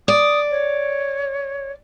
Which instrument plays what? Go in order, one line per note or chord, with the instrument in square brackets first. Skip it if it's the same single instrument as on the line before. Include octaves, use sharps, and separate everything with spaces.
[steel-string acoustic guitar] D5 [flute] D#6
[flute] C#5